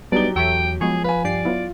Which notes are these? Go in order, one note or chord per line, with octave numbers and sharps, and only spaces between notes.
F#3 G3 B3 D4 D#4 G4 D5 G7
E2 A4 C#5 E5 G5
F3 G#3 B3 G#4 C#5
B4 F5 G#5
G2 G4 D5 C7
F#3 B3 E4 F4